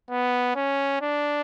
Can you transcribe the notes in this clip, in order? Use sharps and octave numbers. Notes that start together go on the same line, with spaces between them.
B3
C#4
D4